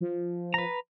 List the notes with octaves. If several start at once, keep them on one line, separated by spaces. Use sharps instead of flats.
F3
B4 A#5